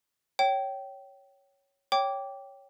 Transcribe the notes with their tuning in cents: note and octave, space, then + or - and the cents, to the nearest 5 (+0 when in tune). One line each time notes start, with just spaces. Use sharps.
C#5 +0 G5 -20
C#5 +0 G5 +0 D6 -15